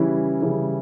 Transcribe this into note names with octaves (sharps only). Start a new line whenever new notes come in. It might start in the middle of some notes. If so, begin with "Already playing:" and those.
Already playing: C#3 E3 G3 C#4 E4
C#3 E3 G3 C#4 E4